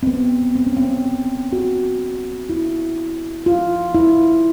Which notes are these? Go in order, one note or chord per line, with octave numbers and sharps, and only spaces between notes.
C4
B3
C4
C#4
C4
F#4
E4
F4
E4